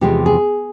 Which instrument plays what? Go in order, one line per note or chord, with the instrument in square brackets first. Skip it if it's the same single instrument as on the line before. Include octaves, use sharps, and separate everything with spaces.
[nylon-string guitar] E2 C3 F3 G#3 G4
G#4